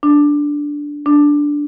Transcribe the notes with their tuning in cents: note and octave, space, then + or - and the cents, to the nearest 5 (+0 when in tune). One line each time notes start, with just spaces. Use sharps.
D4 -5
D4 -5